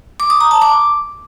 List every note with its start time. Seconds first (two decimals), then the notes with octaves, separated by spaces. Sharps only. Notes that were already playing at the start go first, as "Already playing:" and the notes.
0.20 D6
0.30 D#6
0.41 A#5
0.51 A5
0.62 D6